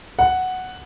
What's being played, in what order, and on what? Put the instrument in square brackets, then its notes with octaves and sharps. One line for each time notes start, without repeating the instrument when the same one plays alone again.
[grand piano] F#5